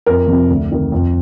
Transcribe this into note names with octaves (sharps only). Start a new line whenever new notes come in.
F2 A#4
C3 F3
D2
C3 D#3
F2